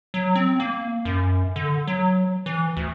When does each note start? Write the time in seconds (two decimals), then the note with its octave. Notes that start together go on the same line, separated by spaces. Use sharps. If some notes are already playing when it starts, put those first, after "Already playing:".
0.14 F#3
0.35 C4
0.60 A#3
1.05 F#2
1.56 D3
1.87 F#3
2.46 E3
2.77 D2